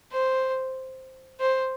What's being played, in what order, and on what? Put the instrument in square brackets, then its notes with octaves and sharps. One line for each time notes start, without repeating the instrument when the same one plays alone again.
[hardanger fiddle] C5
C5